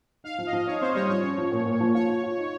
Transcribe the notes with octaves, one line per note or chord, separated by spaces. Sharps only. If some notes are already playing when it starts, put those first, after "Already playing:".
D#4 F5
F3
D#5
F3
D#4 C#5
C4 C5
G3 C#5
F3 C#5
C#4
F3
A#2
A#2
F3
F4 C#5
F4
F4
D#4